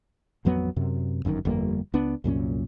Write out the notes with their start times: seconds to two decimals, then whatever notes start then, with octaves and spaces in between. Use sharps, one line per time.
0.45 A1 F2 F#3 B3
0.76 F#2 C3
1.25 G1 F#2 A2 D#3
1.45 G1 F2 G3 A#3
1.94 C#2 B3 D4
2.24 C2 F#2 A#2 C#4